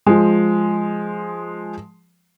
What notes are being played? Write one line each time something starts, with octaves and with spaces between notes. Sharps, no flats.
F3 G#3